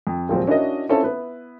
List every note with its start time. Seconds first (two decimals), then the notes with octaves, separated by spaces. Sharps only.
0.07 F2
0.29 D#2 A#2 F3 F#3 G#3 C4
0.47 C#4 D4 E4 F#4 A#4 D#5
0.89 C4 C#4 E4 F4 A4
1.03 B3 E4 B4